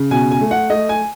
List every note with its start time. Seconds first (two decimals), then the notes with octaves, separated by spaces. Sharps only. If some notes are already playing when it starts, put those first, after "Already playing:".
Already playing: C#3
0.11 B2 G#5
0.31 G#5
0.41 A3
0.51 F#5
0.70 A3 D#5
0.89 G#5